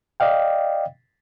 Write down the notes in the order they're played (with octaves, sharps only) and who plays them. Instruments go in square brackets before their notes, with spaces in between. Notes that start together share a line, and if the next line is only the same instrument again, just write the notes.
[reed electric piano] D5 D#5 F5 G5